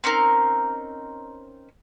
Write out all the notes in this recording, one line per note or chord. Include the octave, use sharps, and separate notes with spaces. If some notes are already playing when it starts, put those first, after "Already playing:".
C4 C#4 D#4 A#4